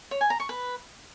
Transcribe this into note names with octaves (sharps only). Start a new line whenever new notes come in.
C#5
G#5
A#5
C#6
B4